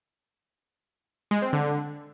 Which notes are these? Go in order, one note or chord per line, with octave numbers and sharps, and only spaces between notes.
G#3
C4
D3